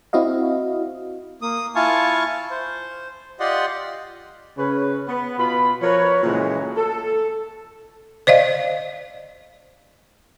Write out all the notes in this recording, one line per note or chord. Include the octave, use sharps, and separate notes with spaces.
C4 E4 F#4 D#5 F5
A#3 D#6
E4 F4 F5 G#5 A5 C#6
C5
F4 G4 D5 D#5 F#5 C6
C#3 B4 C#5
B3
B2 B3 F4 B5
F3 A#4 B4 C#5
A#2 C#3 E3 G#3 A3 F#4
A4
C5 D5 D#5 F5